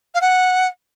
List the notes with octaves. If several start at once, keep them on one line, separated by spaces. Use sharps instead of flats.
F5
F#5